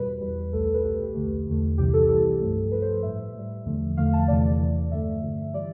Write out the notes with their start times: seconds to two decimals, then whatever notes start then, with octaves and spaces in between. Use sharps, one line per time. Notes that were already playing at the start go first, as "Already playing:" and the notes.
Already playing: E2 B2 G3 B4
0.21 E2 B2 G3
0.53 C2 B2 A3 A4
0.64 A4
0.74 B4
0.84 C2 B2 A3 G4
1.15 E2 D3 A3
1.46 E2 D3 A3
1.78 C2 C3 E3 G3 G4
1.93 A4
2.09 C2 C3 E3 G3 A4
2.41 G2 F3 A3
2.72 G2 F3 A3 B4
2.82 C5
3.03 A2 G3 E5
3.34 A2 G3
3.66 E2 D3 F3 A3
3.97 E2 D3 F3 A3 F5
4.13 A5
4.28 E2 C3 E3 A3 D5
4.59 E2 C3 E3 A3
4.91 G2 D3 F3 A3 E5
5.22 G2 D3 F3 A3
5.54 E3 G3 D5